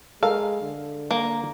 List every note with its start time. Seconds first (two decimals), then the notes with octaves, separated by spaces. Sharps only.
0.23 G#3 A4 A#4 F5
0.62 D3
1.11 A#3